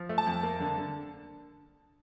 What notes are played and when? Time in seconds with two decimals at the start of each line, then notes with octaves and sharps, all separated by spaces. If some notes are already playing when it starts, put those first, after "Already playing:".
Already playing: F3
0.09 A3
0.18 A5
0.26 F2
0.43 A#3
0.60 D3
0.78 D3